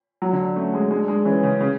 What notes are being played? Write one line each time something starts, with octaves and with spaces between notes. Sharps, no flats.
F#3
D3
A3 C#4
G#3
G#3 D4
G#3
E3 C#4
C#3
C#3